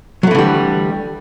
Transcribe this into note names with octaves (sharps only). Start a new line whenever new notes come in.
D3 E3 F#3 G3 A3